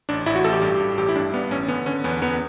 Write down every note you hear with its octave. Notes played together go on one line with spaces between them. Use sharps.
A1 D4
A1 E4
F#4
A1 A4
G4
G2
G2
A1 G4
E4
G2 D4
G2 B3
A1 C#4
D3 B3
D3 C#4
E2 B3
E2 B3